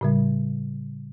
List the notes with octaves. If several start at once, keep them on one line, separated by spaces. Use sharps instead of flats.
A2 C#3 G3